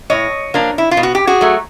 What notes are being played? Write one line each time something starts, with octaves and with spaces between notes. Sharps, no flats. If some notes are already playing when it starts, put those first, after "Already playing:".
A2 C#5 D#5
F3 A#3 D4
E4
F4
B2
F#4
G4
F#4 G#4
F#3 A3